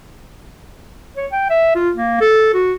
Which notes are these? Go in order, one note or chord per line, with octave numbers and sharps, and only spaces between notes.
C#5
G5
E5
F4
A#3
A4
F#4